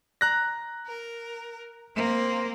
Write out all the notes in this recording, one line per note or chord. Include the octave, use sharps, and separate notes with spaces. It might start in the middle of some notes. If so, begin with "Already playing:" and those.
A#5 F#6 A#6
A#4
A#3 C4